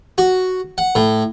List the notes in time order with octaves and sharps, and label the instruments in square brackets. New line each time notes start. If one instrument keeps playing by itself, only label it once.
[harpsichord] F#4
F#5
A2